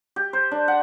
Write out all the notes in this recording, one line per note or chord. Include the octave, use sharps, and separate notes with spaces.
G4
C5
D4
F#5